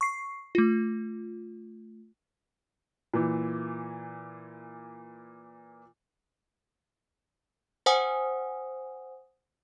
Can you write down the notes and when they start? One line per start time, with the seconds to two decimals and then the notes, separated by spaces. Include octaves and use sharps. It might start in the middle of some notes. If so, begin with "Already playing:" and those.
0.01 C#6 C7
0.55 A3 F4
3.14 A#2 E3
7.86 C5 F#5 G#5 D#6